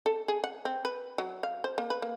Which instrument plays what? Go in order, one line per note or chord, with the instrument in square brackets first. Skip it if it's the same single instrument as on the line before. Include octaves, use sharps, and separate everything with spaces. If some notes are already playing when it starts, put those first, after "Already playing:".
[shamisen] A4
G#4
F#5
C4
B4
F#3
F5
C5
A#3
B4
A#3